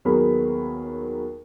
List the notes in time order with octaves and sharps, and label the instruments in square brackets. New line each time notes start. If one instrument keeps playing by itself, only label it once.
[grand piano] D#2 F#3 B3 G#4 A#4 B5